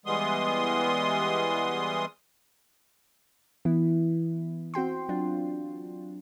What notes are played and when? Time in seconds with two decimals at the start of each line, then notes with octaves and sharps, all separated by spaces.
0.06 E3 G3 G#3 B3 C6 D#6
3.65 E3 B3 E4
4.74 C4 F#4 G5 C6
5.09 F#3 D4 F4